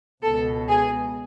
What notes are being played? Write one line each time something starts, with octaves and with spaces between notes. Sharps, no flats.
C#2 B2 A4
G#4